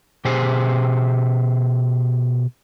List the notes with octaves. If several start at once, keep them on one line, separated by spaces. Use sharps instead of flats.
B2 G4 G#4 C5